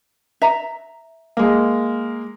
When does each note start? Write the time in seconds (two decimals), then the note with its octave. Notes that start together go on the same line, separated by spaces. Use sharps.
0.42 E5 A#5
1.37 G#3 A#3